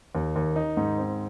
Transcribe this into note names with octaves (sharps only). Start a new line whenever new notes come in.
D#2
D#2
D#4
G#2
C4